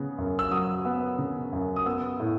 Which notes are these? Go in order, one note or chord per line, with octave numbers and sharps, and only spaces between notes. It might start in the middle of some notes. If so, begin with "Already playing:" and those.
Already playing: C#3 B3
F#2
E6
F#3 D#6
B3
C#3
F#2
D#6
B3 E6
A2